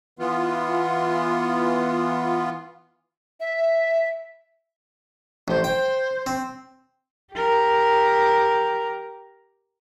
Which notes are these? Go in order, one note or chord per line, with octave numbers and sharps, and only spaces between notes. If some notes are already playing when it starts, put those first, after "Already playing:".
E3 B3 F4
E5
A1 C5
C5 G5
C4
G4 A#4